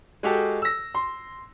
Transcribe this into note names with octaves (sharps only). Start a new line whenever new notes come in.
G#3 F#4 G4 A4
E6 A#6
C6